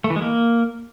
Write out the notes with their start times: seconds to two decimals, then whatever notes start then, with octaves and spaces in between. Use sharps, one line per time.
0.04 A3
0.10 E3
0.16 G#3
0.22 A#3